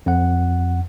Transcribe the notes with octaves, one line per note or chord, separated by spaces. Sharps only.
F2 F#5